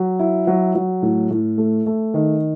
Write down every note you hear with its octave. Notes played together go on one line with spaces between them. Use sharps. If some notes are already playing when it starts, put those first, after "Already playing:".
Already playing: F#3
E4
F#3
F#3
A2
A2
A3
A3
D#3